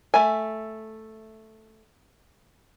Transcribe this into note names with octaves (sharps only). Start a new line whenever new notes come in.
A3 E5 G#5